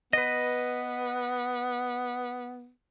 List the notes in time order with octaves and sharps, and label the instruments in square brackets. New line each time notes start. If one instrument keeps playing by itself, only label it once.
[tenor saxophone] B3 [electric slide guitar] B4 D#5